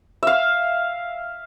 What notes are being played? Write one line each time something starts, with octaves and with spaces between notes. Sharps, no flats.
E5 F5